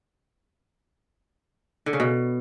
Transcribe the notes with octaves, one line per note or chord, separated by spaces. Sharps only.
D3
C#3
B2